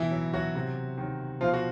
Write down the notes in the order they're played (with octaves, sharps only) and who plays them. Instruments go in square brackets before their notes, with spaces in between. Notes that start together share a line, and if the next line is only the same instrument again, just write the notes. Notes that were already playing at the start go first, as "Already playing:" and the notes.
Already playing: [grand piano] B2 E3 E4
F#3
F#3 F#4
C3
D#3 F#3
B2 F3 F4
F#4